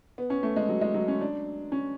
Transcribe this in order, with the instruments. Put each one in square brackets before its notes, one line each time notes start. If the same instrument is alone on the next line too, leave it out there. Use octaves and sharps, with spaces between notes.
[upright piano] B3
C#4
A3
G#3
F#3
G#3
F#3
C#4
D4
C#4